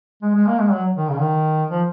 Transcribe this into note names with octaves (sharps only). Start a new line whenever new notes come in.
G#3
G#3
A#3
G#3
F#3
D#3
C#3
D#3
F3